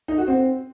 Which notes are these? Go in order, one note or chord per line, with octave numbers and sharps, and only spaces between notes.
D#4
F#4
C4